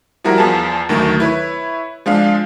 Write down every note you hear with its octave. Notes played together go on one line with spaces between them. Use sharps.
F3 G3 E4 F#4 A#4
E2 F3 G#4 A5
D2 D#3 F#3 A3
E4 B4 C#5
F3 G#3 D4 F5